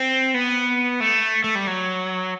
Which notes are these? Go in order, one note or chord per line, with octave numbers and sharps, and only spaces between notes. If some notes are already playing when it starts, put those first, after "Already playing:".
Already playing: C4
B3
A3
A3
G3
F#3